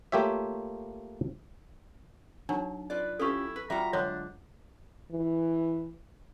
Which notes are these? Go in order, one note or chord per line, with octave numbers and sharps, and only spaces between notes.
A3 A#3 F4 G4 C#5 E5
F#3 D4 D#4
F4 B4 D5
C#4 E4 F4 G4 A4 C#6
B4
G3 F4 F#4 E5 A#5
D3 F#3 G#3 D4 C#5
E3